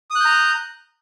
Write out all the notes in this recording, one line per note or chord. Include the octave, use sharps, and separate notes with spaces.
A#5 D#6 F#6 G6